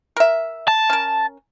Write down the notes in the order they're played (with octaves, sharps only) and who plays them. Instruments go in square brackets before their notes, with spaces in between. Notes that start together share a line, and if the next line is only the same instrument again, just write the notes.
[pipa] A#4 E5
[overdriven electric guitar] A5
[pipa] C#4 A#4